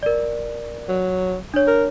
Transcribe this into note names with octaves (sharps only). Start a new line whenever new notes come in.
A#4 D5
F#3
D4 C#5
A#4